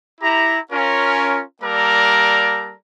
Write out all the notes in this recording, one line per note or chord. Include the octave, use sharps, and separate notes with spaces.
E4 G4 A#5
C#4 F4 A#4
G3 A#3 A4 A#4 D5 A#5